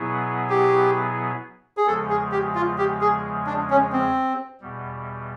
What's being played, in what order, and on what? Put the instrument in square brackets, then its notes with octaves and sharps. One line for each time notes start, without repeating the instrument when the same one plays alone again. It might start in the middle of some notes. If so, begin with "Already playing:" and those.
Already playing: [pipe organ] B2 F#3 B3 E4 G#4
[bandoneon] G4
G#4
[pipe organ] E2 C#3 F3 G#3 [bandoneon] A4
[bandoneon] G#4
G4
F4
G4
G#4
D4
C#4
C4
[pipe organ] E2 B2 G3